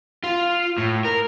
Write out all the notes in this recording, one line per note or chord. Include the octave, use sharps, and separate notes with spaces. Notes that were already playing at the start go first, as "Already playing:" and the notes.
F4
A2
A#4